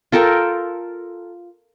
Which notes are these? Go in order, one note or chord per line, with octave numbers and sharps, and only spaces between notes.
F4 A4 A#4 G5